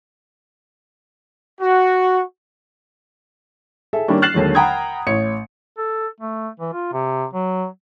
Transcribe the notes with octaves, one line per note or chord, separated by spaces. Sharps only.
F#4
G#4 A4 E5
D#3 G3 A#3 C#4 D4
F6 F#6 A6 C7 E7 F#7
D#2 D3 F#3 G#3
F#5 G5 A#5 B5 D#6 G#6
A1 C#5 C#7
A4
A3
E3
F4
C3
F#3